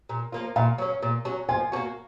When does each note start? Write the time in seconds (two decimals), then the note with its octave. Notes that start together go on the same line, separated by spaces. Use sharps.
0.09 A#2
0.32 F3 A#3 F4
0.56 A#2 F5
0.78 F#3 C#4
1.02 A#2
1.25 F#3 C#4
1.49 F3 G#5
1.72 A#3 C#4 F#4